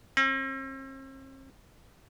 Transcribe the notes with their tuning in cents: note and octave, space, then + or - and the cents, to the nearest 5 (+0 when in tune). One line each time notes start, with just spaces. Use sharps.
C4 +45